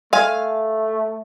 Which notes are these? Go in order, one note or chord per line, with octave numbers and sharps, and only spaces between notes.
A3 F5 G#5